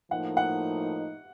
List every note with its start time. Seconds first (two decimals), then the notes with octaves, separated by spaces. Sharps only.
0.11 A2 F3 A#3 D#4 F#5
0.37 F#5